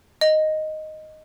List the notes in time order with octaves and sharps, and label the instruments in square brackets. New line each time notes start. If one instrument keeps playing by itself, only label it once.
[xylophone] D#5